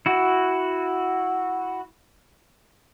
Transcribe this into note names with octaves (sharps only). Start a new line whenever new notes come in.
E4 F#4